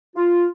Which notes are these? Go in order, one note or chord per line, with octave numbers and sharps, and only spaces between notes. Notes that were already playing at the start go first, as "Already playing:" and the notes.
F4